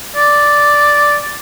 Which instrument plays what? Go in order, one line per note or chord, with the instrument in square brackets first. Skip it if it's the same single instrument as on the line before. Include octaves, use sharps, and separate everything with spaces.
[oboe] D5